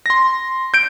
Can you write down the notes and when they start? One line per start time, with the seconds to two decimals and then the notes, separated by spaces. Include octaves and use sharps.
0.06 C6 A#6
0.74 G6 D7